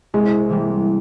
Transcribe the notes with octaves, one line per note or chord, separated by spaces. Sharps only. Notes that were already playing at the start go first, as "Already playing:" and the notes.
C2 G#3
C3 E3 G3 A#3